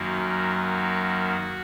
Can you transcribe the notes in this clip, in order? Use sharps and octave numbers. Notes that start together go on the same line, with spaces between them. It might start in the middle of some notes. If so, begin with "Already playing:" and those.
Already playing: F#2 D#3 A#3 F#4